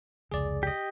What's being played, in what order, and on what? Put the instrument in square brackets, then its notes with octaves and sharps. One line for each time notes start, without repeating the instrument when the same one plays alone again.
[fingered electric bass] F1 C#2 [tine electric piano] G#4 D5
[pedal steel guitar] G4 D#5